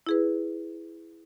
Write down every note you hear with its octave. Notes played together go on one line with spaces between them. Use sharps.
E4 G#4 B4